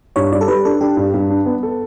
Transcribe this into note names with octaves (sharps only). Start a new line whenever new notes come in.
G2 C#5
G3 D5
A4
G3 B4
D4 A4
D4 G4
G2
G2
D4
B3
A4